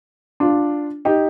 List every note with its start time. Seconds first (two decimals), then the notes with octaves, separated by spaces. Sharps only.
0.40 D4 F4
1.05 D#4 G4